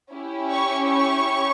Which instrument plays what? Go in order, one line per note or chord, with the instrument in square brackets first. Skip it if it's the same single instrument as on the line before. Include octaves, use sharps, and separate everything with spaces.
[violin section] C#4 E4 G4
C#5 C#6
C#5 C#6